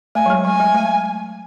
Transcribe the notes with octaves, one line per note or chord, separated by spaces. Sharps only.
A3 G#5
F#3
G#3
F#3 G#5
G#3
A3